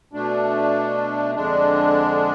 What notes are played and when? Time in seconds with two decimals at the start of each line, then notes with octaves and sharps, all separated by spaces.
0.13 B2 A3 D4
1.35 F2 D3 G#3 D4